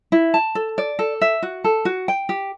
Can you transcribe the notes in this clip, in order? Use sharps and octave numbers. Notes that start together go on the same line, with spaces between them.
E4
A5
A4
D5
A4
E5
F#4
A4
F#4
G5
G4